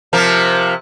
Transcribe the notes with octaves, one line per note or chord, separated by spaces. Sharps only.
C3 F3 A#4